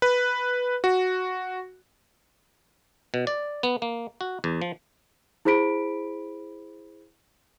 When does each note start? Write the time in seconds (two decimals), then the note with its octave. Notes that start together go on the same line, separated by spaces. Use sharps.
0.02 B4
0.84 F#4
3.14 B2
3.27 D5
3.63 B3
3.82 A#3
4.21 F#4
4.44 E2
4.62 F3
5.45 E4 G#4 C5 B5 B6 D7